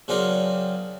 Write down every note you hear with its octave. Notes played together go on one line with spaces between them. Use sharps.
C#3 F#3 C4 D4 D#4 A#4